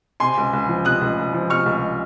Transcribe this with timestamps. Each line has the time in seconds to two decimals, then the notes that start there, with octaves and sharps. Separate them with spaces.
0.20 C3 G#5 C6
0.37 C#2
0.53 C#2
0.68 F3
0.85 C3 D#6 F#6
1.01 C#2
1.18 C#2
1.33 F3
1.50 C3 C#6 F6
1.66 C#2